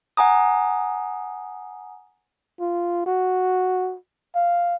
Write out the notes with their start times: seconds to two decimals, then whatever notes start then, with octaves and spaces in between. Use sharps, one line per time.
0.17 F#5 G#5 A#5 D#6
2.60 F4
3.06 F#4
4.36 F5